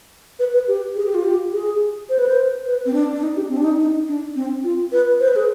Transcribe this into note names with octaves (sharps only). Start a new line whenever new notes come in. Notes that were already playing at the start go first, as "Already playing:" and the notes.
B4
B4
G4
G#4
G4
F4
G4
G#4
C5
B4
C5
B4
C4
D4
D4
D#4
G4
C4
D4
D#4
D#4
D4
C4
F4
B4
C5
B4
G#4